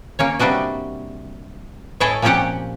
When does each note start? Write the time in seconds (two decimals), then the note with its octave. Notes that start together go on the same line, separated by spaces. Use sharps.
0.19 A#3 C#4 C#5
0.39 C3 G3 D4 F#4 D#5
2.00 A2 E4 G#4 A4 C#5 D#5
2.22 A#2 F3 C4 C#4 G4 F#5